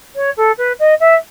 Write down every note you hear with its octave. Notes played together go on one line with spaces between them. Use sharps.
C#5
A4
B4
D#5
E5